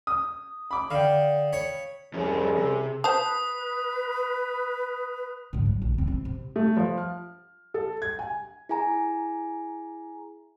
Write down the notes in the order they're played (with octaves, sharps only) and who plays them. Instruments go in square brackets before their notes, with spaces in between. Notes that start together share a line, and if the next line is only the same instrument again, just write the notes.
[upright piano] D#6
B5 D6
[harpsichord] D3 [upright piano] F5 G5
[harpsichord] C#5 B5
[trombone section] C2 E4 G#4 [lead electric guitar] F2 C#4
[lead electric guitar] C3
[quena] B4 [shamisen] C5 A5 [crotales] D#6
[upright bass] G#2 D3
F#3
B1
D3 C4
C4
C3
[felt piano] A3
F3
F6
A4
G#6
G#5
[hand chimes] E4 G#4 G#5 A#5